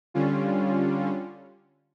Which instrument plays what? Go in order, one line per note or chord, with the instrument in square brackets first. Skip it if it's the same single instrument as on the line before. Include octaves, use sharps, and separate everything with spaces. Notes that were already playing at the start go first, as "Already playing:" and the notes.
[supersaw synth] D3 G3 C#4 F4